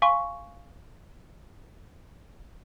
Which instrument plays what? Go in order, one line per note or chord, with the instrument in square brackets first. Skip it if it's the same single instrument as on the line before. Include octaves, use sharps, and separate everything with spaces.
[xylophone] F5 G#5 C6 C#6